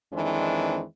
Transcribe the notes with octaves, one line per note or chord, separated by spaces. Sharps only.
F2 D#3 E3 G#3 C4 D4